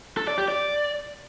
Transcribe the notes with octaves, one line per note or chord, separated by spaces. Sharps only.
A4
D5
G4
D5